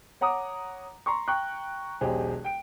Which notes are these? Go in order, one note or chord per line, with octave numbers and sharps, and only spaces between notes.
C#5 F#5 A#5 D6 D#6
A#5 C6 C#6
G5 A#5 C#6 F#6
E1 B1 G4 G#4 C5
G5 D7